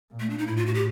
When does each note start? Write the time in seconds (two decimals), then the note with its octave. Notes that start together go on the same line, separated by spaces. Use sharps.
0.12 A#2
0.20 A3
0.30 D4
0.38 D#4
0.47 A2 E4
0.57 F4
0.66 F#4
0.74 G4